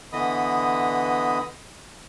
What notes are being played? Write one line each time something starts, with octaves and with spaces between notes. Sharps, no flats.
D3 E3 B3 D#5 B5 D#6